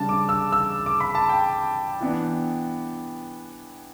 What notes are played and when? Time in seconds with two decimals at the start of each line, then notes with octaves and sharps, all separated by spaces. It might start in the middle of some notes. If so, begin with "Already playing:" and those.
Already playing: C#3 G3 D4 A5
0.09 D6
0.29 E6
0.52 E6
0.86 D6
1.00 B5
1.15 A5
1.29 G5
2.01 E3 B3 D4